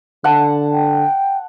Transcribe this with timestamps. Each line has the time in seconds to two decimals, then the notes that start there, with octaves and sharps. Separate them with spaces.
0.24 D3 F#5 A5
0.72 G5